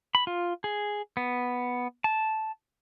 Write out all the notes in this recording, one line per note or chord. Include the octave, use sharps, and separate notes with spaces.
B5
F4
G#4
B3
A5